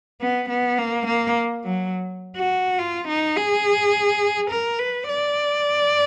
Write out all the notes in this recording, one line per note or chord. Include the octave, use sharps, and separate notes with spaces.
B3
B3
A#3
A#3
F#3
F#4
F4
D#4
G#4
A#4
B4
D5